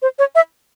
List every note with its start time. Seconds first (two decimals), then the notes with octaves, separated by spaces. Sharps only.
0.02 C5
0.19 C#5
0.35 E5